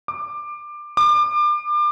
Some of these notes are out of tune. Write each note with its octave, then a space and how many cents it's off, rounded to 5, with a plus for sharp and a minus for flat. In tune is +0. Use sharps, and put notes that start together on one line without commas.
D6 +20
D6 +30